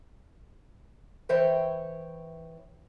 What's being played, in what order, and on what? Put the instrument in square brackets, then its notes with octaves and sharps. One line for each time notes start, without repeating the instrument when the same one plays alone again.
[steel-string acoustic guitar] E3 C5 C#5 E5 G5